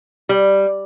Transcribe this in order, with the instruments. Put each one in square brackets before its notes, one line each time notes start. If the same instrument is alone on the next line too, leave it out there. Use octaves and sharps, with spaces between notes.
[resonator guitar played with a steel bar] G3